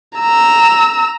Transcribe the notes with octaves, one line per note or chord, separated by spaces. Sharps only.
A#5 E6